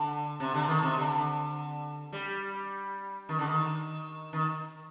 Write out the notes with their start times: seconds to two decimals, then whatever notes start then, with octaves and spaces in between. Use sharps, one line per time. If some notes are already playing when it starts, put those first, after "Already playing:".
Already playing: D3
0.40 C3
0.54 D3
0.68 D#3
0.83 C3
0.98 D3
2.13 G3
3.29 D#3
3.39 D3
3.48 D#3
4.33 D#3